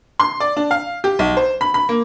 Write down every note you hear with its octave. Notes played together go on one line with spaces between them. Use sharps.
C6
D5
D4
F5
G4
B1
C5
B5
B5
A#3